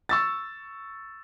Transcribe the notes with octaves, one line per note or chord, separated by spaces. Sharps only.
C#6 E6 A6